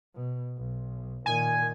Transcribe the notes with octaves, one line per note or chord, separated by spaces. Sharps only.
B2
B1
A#2 D#3 G#5